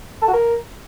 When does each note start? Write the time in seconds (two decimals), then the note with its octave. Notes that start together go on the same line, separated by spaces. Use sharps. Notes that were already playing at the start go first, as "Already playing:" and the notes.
0.22 A4
0.28 F#4
0.34 A#4